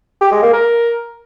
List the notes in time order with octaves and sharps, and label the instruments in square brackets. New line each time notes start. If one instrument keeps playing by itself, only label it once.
[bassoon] G4
G#3
A#3
A#4